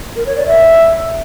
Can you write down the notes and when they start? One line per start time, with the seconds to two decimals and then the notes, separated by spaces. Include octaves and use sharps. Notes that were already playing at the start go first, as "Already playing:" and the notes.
0.16 A#4
0.26 C#5
0.36 D5
0.47 E5